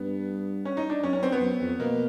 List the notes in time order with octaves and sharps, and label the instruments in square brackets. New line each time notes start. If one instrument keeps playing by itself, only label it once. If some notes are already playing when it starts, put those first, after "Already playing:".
Already playing: [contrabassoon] G2 [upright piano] B3
[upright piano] C#4
D#4
D4
[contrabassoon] F#2 [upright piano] C#4
[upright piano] C#4
C4
B3
[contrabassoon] F#2
F2
[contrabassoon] B2 [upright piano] A#3